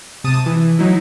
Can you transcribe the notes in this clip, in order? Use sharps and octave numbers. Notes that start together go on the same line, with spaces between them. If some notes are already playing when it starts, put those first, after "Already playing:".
C3 A5 D#6 D#7
E3
F#3 D#4 E4